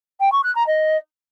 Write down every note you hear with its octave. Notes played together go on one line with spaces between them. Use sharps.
G5
C#6
F#6
A#5
D#5